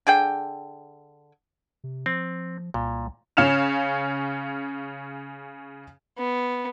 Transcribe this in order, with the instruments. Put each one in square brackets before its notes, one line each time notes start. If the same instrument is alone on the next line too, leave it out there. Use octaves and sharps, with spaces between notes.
[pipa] D3 G#4 G5
[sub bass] C3
[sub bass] F3 [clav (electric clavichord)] C4
[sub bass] C2 [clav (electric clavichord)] A#2
[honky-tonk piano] C#3 C#4 F5 F6 E7 F7
[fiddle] B3